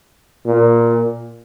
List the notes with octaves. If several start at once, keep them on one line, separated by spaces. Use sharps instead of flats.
A#2